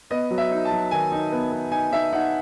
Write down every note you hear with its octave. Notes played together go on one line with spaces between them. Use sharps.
B3 D#5
F#3
E5
D#4
A5
F#3
D#3 G#5
D#4
B3
B3
D#4 G#5
D#4 E5
D#4 F#5